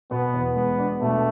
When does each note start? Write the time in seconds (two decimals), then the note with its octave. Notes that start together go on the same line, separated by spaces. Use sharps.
0.11 B2 B3
0.34 E2
0.56 G#3 B3
0.78 D4
1.01 B2 A3